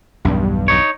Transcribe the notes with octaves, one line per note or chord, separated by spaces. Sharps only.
B1 E2 G2
D#4 C#5